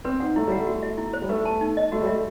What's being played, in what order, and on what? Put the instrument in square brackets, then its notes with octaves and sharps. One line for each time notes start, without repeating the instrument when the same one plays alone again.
[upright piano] C4 [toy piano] B4
[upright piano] D#4 [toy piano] F#5
[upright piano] A3 [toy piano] E4
[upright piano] G3 [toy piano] F#5
[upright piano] A3
[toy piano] F#4
E5
E4
C5
[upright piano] G3
[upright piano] A3 [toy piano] B4
[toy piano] A5
D#4
D#5
[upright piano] A3 [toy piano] F#4
[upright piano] G3
[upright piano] A3 [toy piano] E5